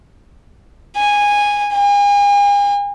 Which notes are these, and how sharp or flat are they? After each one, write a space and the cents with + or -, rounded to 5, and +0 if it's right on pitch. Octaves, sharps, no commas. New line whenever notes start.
G#5 -15
G#5 -40